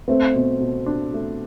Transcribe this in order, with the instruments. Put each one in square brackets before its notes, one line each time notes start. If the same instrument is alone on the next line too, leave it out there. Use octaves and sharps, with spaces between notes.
[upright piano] A3 [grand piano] C4
[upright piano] B2
B2
D4
A3